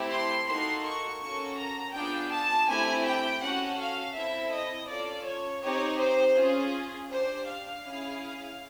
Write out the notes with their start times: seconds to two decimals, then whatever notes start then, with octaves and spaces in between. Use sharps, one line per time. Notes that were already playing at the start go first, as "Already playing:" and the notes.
Already playing: A3 C4 E4 G4
0.10 C6
0.47 A#3 D#4 F#4 A4 C6
0.84 C#6
1.21 A#3 C#4 F#4 A4 C#6
1.57 A#5
1.94 B3 D4 F4 G#4 G5
2.31 A5
2.68 A3 C4 E4 G4 G#5
3.05 G5
3.41 C#4 F#4 A4 F#5
3.78 F5
4.15 C4 E4 A4 E5
4.51 D#5
4.88 C#4 F4 A4 D5
5.25 C#5
5.62 C4 D#4 G4 C#5
5.99 C5
6.35 C#4 F4 G#4
7.09 D4 G4 C5
7.46 F5
7.83 C#4 E4 G#4